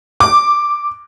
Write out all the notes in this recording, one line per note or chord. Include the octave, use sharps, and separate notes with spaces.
D6